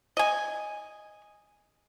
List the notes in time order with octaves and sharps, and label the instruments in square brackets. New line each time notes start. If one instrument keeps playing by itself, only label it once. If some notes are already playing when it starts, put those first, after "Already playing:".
[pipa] D#5 G#5